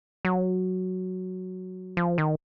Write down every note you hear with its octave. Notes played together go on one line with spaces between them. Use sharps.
F#3
F3
D#3